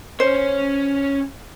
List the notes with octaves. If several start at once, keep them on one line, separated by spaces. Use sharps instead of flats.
C#4 C5 C#5